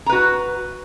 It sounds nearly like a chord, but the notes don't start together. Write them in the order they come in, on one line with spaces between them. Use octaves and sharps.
A#5 B4 F#4